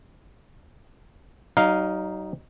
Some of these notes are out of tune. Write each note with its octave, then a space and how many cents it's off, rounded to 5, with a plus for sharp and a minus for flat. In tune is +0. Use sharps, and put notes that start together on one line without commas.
F#3 +40 D#4 +0 F5 +0